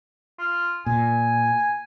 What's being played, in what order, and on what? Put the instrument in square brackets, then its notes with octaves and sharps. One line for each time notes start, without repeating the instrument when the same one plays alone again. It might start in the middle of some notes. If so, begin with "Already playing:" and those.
[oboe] F4
[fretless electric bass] A#2 [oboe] G#5